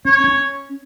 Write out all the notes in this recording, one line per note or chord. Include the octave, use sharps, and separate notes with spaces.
C#4 C#5
C#4